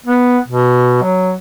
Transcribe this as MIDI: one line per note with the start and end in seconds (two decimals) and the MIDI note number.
0.06 0.38 59
0.48 1.02 47
1.03 1.34 54